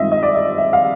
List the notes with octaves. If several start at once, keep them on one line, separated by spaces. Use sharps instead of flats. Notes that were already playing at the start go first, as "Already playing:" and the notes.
Already playing: G2 D#3 G#3 C4 F4 D#5 E5
D#5
D5
D#5
E5
F5